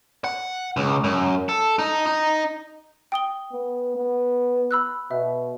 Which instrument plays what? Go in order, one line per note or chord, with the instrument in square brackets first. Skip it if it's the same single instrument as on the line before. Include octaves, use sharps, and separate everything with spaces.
[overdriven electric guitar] F#5
C#2
F#2
A4
D#4
D#4
[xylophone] G5 D#6 G7
[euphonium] B3
B3
[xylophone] B5 E6 F#6
[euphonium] B2 [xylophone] E5